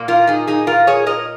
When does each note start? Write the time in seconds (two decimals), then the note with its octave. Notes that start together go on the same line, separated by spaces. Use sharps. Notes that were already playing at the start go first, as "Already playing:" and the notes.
Already playing: A#2 A#3
0.08 F4 A#4
0.27 D#4 G#4
0.47 D#4 G#4
0.67 F4 A#4
0.87 G#4 C#5
1.06 A#4 D#5